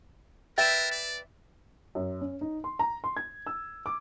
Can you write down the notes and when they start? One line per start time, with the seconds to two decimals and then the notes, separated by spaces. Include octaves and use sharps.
0.58 A#4 B4 E5 G5 A6 E7
0.91 D5
1.95 F#2
2.21 C#4
2.41 D#4
2.64 C6
2.79 A#5
3.04 C6
3.17 G#6
3.47 E6
3.86 D6